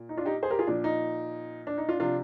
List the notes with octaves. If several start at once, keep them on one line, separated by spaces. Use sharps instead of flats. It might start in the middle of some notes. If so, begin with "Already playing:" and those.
Already playing: A#2
D#4
D4 F4
D#4 G4
G#4 C5
G4 A#4
F4 G#4
A#2 F3 D4
D#4
D4
D#4
D4 F4
C3 F3 D4 F4